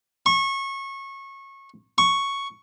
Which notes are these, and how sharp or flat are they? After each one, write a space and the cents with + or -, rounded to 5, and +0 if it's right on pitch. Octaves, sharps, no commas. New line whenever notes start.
C#6 -25
C#6 +0